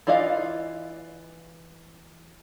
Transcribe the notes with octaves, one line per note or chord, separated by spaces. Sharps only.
E3 F4 D5 D#5 F5